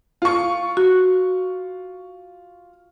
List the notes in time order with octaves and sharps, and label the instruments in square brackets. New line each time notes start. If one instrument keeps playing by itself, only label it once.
[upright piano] F4 C#6
[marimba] F#4